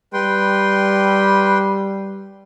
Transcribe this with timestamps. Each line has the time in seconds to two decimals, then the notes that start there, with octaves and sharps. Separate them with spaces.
0.13 G3 B4 G5 C6